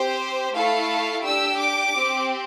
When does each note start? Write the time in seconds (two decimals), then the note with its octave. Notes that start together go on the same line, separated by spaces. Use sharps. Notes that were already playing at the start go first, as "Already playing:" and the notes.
Already playing: C4 G4 C5
0.54 A3 E4 A4 F5
1.24 D4 G4 E6
1.59 D6
1.94 C4 G4